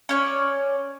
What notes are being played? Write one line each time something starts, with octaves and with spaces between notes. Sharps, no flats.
C#4 C#5 D5